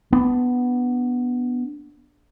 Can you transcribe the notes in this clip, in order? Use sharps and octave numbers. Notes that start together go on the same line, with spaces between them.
B3 D4